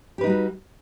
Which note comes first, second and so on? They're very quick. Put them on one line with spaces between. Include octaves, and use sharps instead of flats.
G4 B4 D#4 G3 F#4